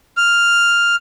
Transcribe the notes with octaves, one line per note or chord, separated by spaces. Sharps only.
F6